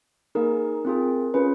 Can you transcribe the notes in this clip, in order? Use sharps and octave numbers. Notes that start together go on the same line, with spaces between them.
A#3 D#4 G#4 A#4
C4 F4 G#4
C#4 F4 G#4 B4